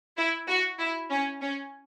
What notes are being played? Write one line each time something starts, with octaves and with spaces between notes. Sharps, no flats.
E4
F#4
E4
C#4
C#4